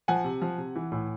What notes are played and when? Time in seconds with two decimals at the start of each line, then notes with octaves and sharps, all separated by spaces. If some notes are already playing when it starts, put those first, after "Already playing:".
0.08 F3 F#5 G#5
0.24 C3
0.42 F3
0.58 C3
0.76 E3
0.92 A2